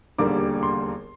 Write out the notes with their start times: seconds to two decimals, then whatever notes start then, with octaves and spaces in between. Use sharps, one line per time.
0.18 E1 D#2 D3 G3 A#3 D6
0.63 C6